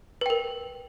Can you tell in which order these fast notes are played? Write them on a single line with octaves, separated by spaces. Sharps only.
B4 G5 A#4